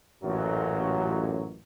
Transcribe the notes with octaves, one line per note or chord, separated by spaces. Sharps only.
A1 F#2 A#2 F#3